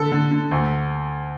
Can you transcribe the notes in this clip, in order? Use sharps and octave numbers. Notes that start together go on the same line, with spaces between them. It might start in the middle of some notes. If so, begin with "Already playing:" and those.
Already playing: D3 A4
D3
D3
D2